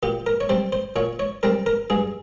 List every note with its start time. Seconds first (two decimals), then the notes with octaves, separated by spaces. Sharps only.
0.03 A#2 G4
0.26 A#4
0.41 C#5
0.49 G3 C4 C5
0.72 C5
0.96 A#2 C#5
1.19 C#5
1.43 G3 C4 A#4
1.66 A#4
1.90 G2 G#4